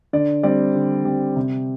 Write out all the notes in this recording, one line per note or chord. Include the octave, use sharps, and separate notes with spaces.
D3 D5
G3 C4 D5
D3
G3 C4
C3